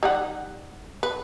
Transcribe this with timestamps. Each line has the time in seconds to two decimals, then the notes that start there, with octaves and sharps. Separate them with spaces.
0.03 G3 D#4 F#5
1.03 B4